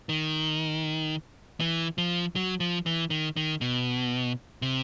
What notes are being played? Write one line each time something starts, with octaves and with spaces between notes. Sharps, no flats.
D#3
E3
F3
F#3
F3
E3
D#3
D#3
B2
C3